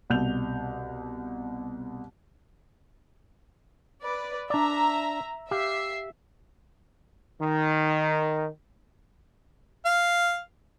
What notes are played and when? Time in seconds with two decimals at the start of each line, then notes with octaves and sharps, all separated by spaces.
0.10 C2 B2 G6 F7
4.02 B4 D5
4.50 D4 D5 E5 A#5
5.51 G4 E5 F5 C7
7.40 D#3
9.85 F5